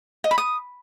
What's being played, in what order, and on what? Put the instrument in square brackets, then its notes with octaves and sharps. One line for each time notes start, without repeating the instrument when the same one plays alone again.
[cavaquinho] D#5
B5
D#6